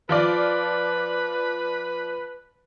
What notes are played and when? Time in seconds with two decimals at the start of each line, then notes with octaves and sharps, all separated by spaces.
0.09 F3 F4 B4 D5